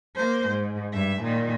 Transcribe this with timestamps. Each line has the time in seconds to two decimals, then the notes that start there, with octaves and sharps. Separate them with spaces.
0.15 A#3 C5
0.48 G#2
0.92 G2 E5
1.22 A#2 D#3